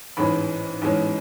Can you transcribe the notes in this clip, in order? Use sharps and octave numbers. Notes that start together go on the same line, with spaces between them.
A1 G#2 G#3 C#4 B5
A1 G#2 G#3 C#4